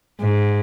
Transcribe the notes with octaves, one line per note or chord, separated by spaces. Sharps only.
G#2